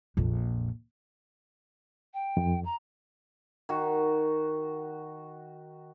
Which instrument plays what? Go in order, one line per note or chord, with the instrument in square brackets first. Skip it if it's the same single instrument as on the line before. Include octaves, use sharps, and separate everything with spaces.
[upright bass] A#1 F2
[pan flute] G5
[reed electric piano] F2
[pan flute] A#5
[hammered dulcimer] D#3 F#4